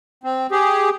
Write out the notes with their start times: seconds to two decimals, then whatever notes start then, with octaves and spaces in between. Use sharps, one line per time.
0.24 C4
0.52 G4 G#4